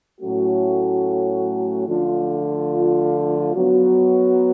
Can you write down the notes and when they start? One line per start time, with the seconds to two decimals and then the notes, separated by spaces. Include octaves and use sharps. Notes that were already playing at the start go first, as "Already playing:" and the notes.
0.21 A2 F#3 A3 C#4 F#4
1.87 D3 F3 A3 F4
3.54 F#3 B3 F#4